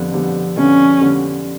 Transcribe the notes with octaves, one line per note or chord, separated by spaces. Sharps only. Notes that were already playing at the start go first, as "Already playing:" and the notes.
Already playing: F2 D3 G3 B3
F2 D3 G3 B3
F2 D3 G3 B3 C#4
D3 G3 B3